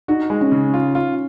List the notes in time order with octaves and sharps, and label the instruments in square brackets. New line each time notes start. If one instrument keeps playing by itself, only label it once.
[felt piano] D#4 [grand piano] F#4
[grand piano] G#3
[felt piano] C#4
[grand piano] C#3
F4
F4